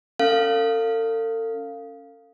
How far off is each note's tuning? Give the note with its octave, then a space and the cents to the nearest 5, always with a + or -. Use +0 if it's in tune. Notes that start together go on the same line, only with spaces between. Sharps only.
C#4 +5 A4 +40 F5 +0